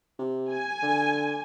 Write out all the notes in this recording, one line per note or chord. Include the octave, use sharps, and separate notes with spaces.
C3
G#5
D3